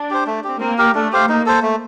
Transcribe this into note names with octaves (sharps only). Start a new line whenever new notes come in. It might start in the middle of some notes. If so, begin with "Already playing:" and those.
Already playing: D4
G4 C5
A3
C4 G4
A#3 C4
G4 A#4
A3 D4
G4 C5 F5
A#3 D#4
A4 C5
A3